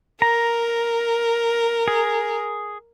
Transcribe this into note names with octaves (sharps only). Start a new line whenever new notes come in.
A#4 A#5
G#4